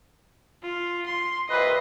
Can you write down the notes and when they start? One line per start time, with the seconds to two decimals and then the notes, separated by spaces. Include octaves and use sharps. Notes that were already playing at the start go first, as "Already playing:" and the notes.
0.62 F4
1.06 C6
1.49 C2 A#2 B4 D#5 C6